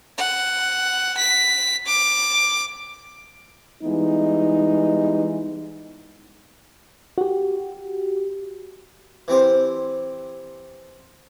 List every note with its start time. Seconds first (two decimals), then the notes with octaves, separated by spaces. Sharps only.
0.18 F#5
1.17 B6
1.86 D6
3.83 E3 G3 G#3 B3 D#4 E4
7.18 F#4 G4
9.28 E3 C4 G4 C5